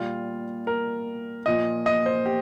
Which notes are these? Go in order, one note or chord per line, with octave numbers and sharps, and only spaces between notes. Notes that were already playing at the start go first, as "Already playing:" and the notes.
Already playing: A#2 G3 F4
A#4
A#2 F3 D#5
D#5
C5
G4